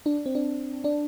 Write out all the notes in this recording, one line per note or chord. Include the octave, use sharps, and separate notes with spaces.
D4
C4
D4
D4